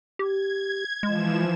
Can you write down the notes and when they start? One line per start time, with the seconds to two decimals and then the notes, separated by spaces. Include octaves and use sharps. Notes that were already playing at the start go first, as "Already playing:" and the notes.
0.19 G4 G#6
1.03 E3 F3 G#3 E7